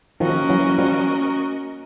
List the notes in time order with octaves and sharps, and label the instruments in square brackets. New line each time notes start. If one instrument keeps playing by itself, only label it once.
[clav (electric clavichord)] D#3 F3 [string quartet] A#3 C#4 F#4 A#4 D#5
[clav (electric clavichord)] E3 F#3
F3 G3